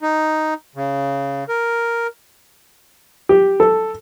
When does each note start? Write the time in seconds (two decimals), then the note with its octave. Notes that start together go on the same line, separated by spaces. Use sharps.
0.02 D#4
0.76 C#3
1.49 A#4
3.29 G4
3.60 A4